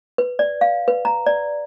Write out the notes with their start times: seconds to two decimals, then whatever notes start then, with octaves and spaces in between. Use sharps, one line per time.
0.18 B4
0.39 D5
0.61 F5
0.88 B4
1.05 A#5
1.26 D5